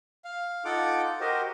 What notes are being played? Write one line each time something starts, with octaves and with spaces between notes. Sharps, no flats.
F5
D#4 F4 A4 F#5 D6
F#4 G4 A#4 C5 D#5